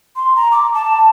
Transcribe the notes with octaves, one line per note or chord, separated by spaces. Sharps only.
C6
A#5
D6
A5